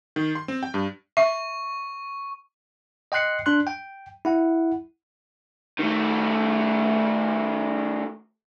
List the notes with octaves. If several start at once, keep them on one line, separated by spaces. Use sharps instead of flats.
D#3
C6
C4
G5
G2
E5 C#6
D#5 G5 C6 F#6 C7 C#7
D4 C6 F#6
G5
E4 F#5
D#3 A3